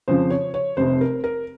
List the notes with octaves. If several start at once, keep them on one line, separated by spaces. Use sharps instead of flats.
F2 C#3 F3 C5
C#5
C#5
F1 F2 C3 C5
A#4
A#4